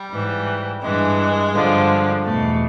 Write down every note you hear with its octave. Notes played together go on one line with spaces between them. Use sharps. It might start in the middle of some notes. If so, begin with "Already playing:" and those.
Already playing: G3
G#2 E3
G2 E3 G#3
G2 D3 F3
E2 B2 A3